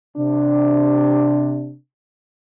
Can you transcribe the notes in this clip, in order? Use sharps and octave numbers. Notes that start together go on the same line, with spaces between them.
C3 D4